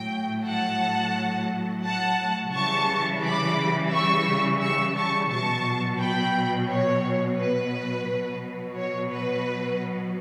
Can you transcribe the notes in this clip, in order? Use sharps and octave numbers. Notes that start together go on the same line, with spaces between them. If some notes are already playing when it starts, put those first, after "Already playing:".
Already playing: A2 F#3 G5
F#5 A5
F#5 A5
C#3 E3 G3 A5 C#6
B5 D6
C#6 E6
C#6 E6
A5 C#6
B2 F#3 A5 C#6
G5 B5
C#5
B4
B2 F#3
C#5
B4